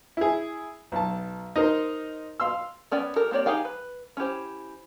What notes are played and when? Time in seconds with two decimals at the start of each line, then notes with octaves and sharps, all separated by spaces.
0.17 E4 G#4
0.92 B1 A5
1.56 D#4 A#4 C5
2.40 F5 C6 E6
2.92 B3 C#4 D5 G5
3.16 G4 A4 A#4
3.31 A#3 C4 G4 C#5 D5
3.46 D#4 G4 G#4 F5 G5
3.65 B4
4.17 C#4 E4 G4 C5